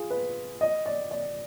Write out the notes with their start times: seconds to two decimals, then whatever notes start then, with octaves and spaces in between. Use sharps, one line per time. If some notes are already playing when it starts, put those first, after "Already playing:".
Already playing: F4 G#4
0.10 B4
0.61 D#5
0.86 D5
1.11 D5